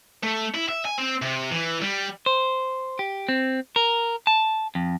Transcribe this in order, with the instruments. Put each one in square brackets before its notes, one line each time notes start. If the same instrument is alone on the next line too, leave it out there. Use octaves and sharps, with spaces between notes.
[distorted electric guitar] A3
E4
E5
G#5
C4
C3
E3
G3
[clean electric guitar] C5
G4
C4
A#4
A5
F2